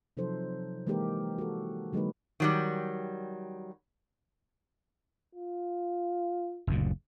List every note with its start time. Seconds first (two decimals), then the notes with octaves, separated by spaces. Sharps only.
0.17 C3 F3 F#3 D#4 A4 C5
0.87 E3 G#3 A#3 D#4 G4 A#4
1.38 F#4 A4
1.93 D3 F#3 G#3 A#3 D#4 B4
2.40 D#3 F#3 G3
5.35 F4
6.67 F#1 D2 A#2